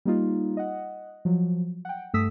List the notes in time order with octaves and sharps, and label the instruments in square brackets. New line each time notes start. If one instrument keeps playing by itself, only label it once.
[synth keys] G3 A#3 D#4 F4
D#5 F#5
F3 F#3
F#5 G5
G2 A3 A4 D#6 E6 B6